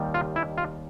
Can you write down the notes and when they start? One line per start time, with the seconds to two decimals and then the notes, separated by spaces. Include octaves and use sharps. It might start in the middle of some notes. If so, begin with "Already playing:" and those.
Already playing: D#2 D#3 G3
0.14 F4
0.36 E4
0.58 F4